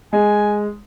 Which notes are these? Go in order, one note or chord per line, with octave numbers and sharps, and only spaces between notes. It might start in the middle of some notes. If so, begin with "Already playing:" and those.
G#3 G#5